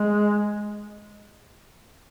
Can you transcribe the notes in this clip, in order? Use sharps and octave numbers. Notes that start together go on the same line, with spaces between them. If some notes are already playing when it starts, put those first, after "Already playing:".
Already playing: G#3